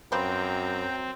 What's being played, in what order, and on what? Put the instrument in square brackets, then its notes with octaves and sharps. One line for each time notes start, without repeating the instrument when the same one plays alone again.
[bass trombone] F#2 [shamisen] F3 B4 C5 [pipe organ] C4 [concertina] G5 A#5